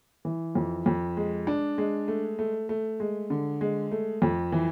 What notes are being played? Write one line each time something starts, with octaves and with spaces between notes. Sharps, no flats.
E3
F2
F2
G#3
D4
G#3
A3
A3
A3
G#3
D3
G#3
A3
F2
E3